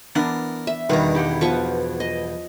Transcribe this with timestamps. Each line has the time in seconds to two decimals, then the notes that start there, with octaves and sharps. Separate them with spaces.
0.15 E3 B3 D4 A#4
0.67 E5
0.90 E2 G2 B2 D#3 G3 A#5
1.15 E4 G4 F#5
1.41 F3 B3 C#6
2.00 D#5